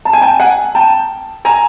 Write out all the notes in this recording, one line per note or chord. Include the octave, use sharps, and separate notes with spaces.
A5
G#5
G5 A5
F#5 G#5
G5 A5
G#5 A#5